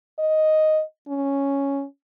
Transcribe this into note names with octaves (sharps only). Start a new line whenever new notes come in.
D#5
C#4